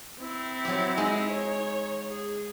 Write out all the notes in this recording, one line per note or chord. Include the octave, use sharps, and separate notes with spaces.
C4 E4
F#3 G4
G#3 D#4
C#5
G#4